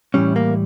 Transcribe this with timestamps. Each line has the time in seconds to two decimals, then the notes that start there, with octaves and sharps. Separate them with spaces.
0.14 A2 E3 G3 C#4
0.36 A#3